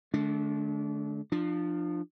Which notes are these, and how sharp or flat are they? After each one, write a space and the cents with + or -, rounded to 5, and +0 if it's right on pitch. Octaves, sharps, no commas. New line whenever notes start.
D3 +30 A3 -40 D4 -30
F3 +0 D4 +35